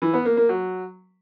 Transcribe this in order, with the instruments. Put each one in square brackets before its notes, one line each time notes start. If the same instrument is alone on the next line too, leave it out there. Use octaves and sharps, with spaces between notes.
[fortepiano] E3
B3
A#3
A#3
F#3